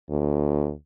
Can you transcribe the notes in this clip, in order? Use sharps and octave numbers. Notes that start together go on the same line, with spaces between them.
D2